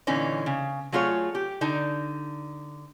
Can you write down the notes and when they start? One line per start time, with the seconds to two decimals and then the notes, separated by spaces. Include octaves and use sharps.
0.07 A#2 D3 E3 C#4 D#4
0.46 C#3
0.92 F#3 A3 F4 G#4 C#5
1.35 G4
1.61 D3 D#4 A5